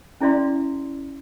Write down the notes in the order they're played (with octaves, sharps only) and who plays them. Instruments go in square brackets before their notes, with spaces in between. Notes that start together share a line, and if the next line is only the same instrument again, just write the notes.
[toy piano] C#4 E4 G#4 D5 E5 C6